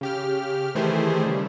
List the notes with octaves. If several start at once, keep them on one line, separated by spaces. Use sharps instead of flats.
C#3 G4 F6
D#3 E3 A3 G4 G#4 C5
C#3 G3